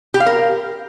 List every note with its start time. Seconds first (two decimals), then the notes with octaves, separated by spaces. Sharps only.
0.14 G4
0.20 F5
0.26 A#4